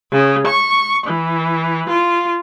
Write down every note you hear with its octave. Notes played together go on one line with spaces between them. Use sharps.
C#3
C#6
E3
F4